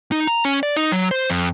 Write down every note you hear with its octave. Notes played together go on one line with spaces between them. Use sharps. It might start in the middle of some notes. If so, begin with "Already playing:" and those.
D#4
A#5
C#4
D5
D#4
F#3
C5
F2